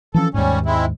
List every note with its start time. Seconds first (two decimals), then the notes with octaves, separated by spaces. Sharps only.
0.14 E3 F3 C#4 A4
0.34 D#2 G#2 G3 C#4
0.66 G#3 C4 E4